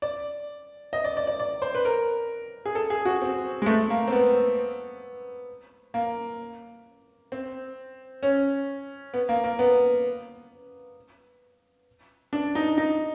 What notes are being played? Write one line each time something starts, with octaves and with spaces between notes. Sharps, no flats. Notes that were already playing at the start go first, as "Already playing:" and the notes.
D5
D#5
D5
D5
D5
D5
C5
B4
A#4
G#4
A4
G#4
F#4
C4
G#3
A3
A#3
C4
B3
A#3
C4
C#4
B3
A#3
A#3
B3
D4
D#4
D#4